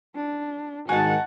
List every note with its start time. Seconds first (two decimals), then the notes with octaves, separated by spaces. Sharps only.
0.16 D4
0.89 G#2 D#3 D#4 F#4 F#5 G#5 A5